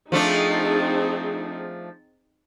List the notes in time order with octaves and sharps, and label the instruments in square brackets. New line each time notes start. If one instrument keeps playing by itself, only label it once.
[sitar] F3 A3 D4 [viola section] C4 D#4 G#4